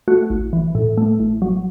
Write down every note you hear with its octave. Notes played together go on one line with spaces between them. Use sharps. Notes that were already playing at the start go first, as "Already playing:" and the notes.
A3 F#4
A1
E3
A2
A3
A1
F#3